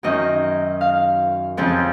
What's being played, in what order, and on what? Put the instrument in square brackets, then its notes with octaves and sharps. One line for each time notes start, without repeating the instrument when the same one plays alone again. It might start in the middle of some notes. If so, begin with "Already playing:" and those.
[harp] F#2 D#3 F#3 D#5
F5
F2 C#3 F3